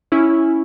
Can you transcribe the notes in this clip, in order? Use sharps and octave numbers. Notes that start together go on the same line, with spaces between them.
C#4 E4